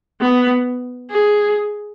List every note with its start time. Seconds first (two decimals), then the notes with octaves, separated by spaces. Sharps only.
0.21 B3
1.11 G#4